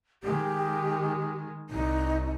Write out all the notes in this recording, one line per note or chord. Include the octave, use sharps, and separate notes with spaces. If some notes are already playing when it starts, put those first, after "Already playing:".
D#3 G#3 G4
C2 D#4